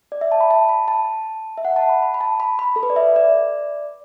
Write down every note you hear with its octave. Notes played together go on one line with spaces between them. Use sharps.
D5
E5
A5
B5
A5
B5
A5
E5
F#5
A5
B5
B5
B5
A5
B5
B5
A4
B4
D5
E5
D5